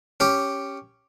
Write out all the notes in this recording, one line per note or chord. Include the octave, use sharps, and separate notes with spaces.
C#4 G4